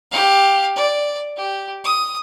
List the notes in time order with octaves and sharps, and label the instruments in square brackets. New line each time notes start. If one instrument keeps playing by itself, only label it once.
[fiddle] G4 F5
D5
G4
D#6